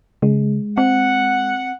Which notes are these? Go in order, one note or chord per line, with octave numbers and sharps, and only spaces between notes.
C#3 G#3
C4 F#5